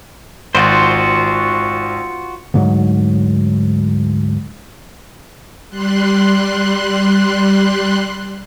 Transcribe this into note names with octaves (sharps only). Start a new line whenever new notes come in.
G#1 F4 F#4 C5 D7
D2 G#2 F#3
G3 C6 F#6